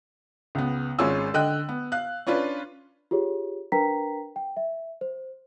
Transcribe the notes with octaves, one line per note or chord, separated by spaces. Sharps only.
C#2 B3
G#1 G#3 C#4 F4 G#5 E6
D3 D#5 G5 F#6
B3
F5 F#6
C#4 D4 F4 B4
F4 G4 G#4 C#5
D4 A#4 B4 G5 A#5 B6
G5
E5
C5